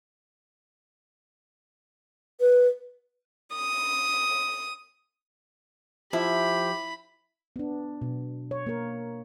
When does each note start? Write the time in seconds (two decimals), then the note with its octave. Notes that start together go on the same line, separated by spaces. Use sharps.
2.41 B4
3.56 D#6
6.13 F3 E4 G4 B5
7.56 B3 D4
8.02 B2
8.51 C#5
8.66 A#3 A#4